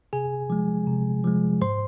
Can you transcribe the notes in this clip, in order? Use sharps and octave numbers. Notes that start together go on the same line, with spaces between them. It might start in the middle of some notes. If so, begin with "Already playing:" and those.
C3 G#4 G#5
F3 G#3
C3
F3 G#3
G#2 C5 C6